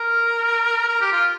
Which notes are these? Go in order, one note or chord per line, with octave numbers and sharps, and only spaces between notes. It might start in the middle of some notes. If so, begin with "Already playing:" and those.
Already playing: A#4
A#4
G4
F4